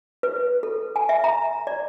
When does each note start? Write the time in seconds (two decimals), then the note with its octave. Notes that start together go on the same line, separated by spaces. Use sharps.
0.23 B4
0.63 A4
0.96 G#5
1.09 E5
1.24 A#5
1.67 D5